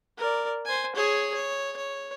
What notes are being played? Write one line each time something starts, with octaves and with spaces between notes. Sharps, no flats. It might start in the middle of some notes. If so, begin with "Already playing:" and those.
A#4 D5
C5 G#5
G#4 C#5
C#5
C#5